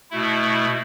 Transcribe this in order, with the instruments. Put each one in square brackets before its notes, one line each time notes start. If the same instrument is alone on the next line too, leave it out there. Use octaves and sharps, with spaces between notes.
[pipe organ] B2 A3 E4